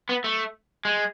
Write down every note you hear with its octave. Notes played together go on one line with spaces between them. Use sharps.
B3
A3
G#3